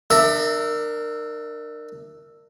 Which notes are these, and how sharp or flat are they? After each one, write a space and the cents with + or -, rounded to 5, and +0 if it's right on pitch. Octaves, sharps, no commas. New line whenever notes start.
D4 +35 A#4 -10 E5 +0